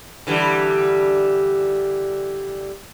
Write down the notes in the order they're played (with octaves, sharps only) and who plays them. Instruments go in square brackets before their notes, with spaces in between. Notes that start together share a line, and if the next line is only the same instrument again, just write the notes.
[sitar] D3 E3 G3